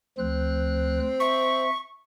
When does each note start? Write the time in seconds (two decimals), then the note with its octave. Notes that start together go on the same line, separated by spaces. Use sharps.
0.18 D2 F3 C4 F#6
1.20 E5 C#6